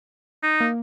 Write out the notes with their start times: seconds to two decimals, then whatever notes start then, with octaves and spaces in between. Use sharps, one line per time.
0.43 D#4
0.60 A#3